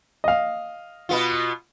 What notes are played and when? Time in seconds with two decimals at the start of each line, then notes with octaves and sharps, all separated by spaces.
0.24 D#5 F5
1.09 B2 B3 F4